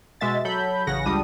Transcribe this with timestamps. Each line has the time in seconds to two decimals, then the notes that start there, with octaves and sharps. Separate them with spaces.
0.21 B2 G#3 E5 A6
0.45 F#3 A4 B5 G6
0.87 A1 C#3 F#5 A#6
1.06 C#2 G3 D4 D#6